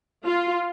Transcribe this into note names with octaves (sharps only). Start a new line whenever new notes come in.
F4